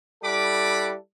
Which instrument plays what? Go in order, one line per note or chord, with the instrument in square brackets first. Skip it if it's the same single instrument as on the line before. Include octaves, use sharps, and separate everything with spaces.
[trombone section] G3 E4 A4 [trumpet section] F#5 B5 D6